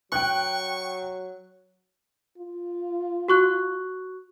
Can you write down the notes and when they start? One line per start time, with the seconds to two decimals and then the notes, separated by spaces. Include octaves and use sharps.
0.12 F#3 G5 C#6 F#6
2.38 F4
3.28 F#4 C#6 F#6